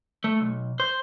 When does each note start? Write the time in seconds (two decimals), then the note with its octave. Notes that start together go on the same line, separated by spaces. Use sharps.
0.24 A3
0.41 B1
0.80 C5